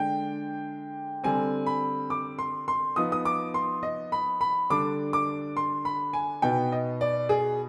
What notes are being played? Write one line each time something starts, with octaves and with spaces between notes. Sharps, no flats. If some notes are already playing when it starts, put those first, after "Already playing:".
Already playing: D3 G#3 D4 G5
D3 G3 C4 G#5
B5
D6
C6
C6
F3 B3 D#4 D#6
D#6
D6
C6
D#5
B5
B5
D3 G3 D4 D6
D6
C6
B5
G#5
B2 B3 D#4 G5
D#5
D5
G#4